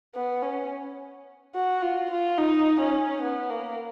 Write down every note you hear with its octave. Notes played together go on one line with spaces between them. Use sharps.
B3
C#4
F#4
F4
F4
D#4
C#4
B3
A#3